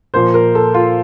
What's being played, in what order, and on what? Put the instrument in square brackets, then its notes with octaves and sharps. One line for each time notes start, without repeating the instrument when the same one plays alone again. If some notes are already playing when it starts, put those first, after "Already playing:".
[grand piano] A#2 F3 A#3 C5
A#4
A4
F4